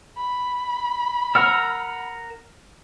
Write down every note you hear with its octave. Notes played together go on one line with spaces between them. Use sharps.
B5
A#4 F#5 E6 F6